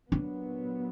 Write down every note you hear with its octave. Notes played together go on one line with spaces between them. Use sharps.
A#2 F#3 B3 D4